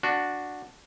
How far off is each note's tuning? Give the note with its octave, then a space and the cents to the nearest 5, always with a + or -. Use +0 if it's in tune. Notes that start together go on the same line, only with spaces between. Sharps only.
D4 +0 F#4 -5